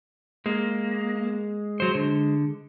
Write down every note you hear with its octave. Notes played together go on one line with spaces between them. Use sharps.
G#3 A#3
F#3 C5
D3